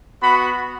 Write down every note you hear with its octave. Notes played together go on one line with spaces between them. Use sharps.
B3 F#4 B5